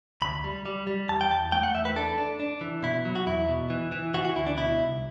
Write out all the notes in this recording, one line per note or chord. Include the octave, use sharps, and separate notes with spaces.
D2 B5
G3
G3
G3
E2 A5
G5
E2 A5
A3 G5
F#5
E2 E5
B4
D4 A4
D4
D4
E3
B2 E4
F#3
F#4
E2 E4
B2
E3
E3
E3 F#4
F#4
D2 E4
D4
B2 E4
C2